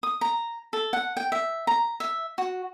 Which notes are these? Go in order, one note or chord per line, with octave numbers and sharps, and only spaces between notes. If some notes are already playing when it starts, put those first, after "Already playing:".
D#6
A#5
A4
F#5
G5
E5
A#5
E5
F#4